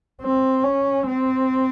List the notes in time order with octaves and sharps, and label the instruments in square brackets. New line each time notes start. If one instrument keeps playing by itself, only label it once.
[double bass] C4
C#4
C4